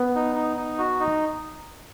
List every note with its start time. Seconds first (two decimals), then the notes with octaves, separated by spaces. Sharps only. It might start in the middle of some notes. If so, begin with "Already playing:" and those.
Already playing: B3
0.15 D#4
0.35 D#4
0.57 D#4
0.78 F#4
1.00 D#4